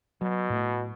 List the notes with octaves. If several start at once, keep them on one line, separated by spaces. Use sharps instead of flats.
B2 F#3
A2 A3